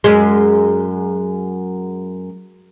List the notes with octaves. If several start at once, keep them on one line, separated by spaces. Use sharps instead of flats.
F#2 G#3